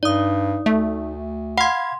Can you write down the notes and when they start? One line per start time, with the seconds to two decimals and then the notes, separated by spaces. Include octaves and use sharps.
0.03 G2 D#4 D5 D#6
0.66 D2 A3
1.58 F5 F#5 B5 C6 G#6